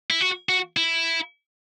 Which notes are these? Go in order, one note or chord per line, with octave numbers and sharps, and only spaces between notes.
E4
F#4
F#4
E4